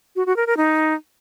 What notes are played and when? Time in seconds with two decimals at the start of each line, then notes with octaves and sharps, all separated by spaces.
0.16 F#4
0.26 F#4
0.36 A#4
0.47 A#4
0.57 D#4